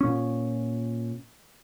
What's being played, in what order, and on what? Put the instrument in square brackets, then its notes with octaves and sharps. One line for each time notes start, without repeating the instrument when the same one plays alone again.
[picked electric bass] A#2 C#4